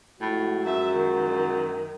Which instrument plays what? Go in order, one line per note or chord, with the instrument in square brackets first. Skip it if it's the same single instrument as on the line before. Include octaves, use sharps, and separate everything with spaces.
[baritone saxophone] A2 [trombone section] F3 G#3 F#4
[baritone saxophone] F#2 [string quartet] E5
[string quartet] D#3